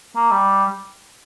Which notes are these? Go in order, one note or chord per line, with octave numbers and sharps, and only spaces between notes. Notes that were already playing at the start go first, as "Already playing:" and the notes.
A#3
G3